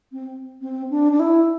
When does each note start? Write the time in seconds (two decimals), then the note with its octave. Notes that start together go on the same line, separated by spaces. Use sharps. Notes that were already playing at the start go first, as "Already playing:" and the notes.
0.12 C4
0.61 C4
0.90 D4
1.12 D4
1.20 E4